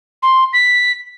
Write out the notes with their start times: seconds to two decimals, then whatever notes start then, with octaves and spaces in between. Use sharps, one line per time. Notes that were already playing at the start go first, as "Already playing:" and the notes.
0.23 C6
0.53 B6